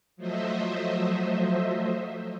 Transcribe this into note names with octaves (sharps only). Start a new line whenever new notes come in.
F3 F#3 A3 C5 D#5 E5